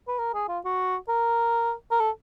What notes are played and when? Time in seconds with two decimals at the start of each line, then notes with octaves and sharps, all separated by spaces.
0.08 B4
0.19 A#4
0.34 G#4
0.48 F4
0.65 F#4
1.09 A#4
1.91 A#4
2.00 A4